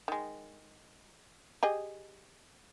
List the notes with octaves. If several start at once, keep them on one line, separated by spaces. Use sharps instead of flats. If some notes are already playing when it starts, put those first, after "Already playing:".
D#3 G#3
G4 G#4 D#5